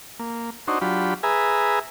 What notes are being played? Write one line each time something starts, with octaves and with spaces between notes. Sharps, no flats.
A#3
D4 D#4 F#4 C5 C#5
F#3 D4 F4 G4 B5
G#4 B4 E5 G#5 A#5